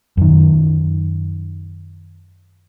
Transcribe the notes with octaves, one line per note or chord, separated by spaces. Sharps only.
F#2 D#3